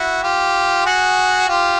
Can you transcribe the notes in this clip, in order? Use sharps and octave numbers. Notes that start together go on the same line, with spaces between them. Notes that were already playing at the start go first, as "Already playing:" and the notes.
Already playing: E4 F#4
F4 G4
F#4 G#4
F4 G4